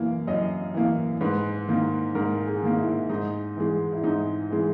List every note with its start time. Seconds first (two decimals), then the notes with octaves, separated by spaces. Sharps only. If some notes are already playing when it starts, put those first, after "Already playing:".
Already playing: F#2 E3 A#3
0.27 F#2 D#5
0.74 E3 A#3
1.21 G#2 B4
1.68 D#3 A#3
2.15 G#2 A#4
2.47 G#4
2.62 D#3 A#3
2.78 E4
3.09 G#2 D#4
3.57 E3 G#3
3.92 E4
4.04 G#2 D#4
4.51 E3 G#3